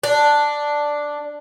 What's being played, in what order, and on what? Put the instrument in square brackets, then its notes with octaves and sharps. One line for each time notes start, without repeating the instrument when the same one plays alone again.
[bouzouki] D4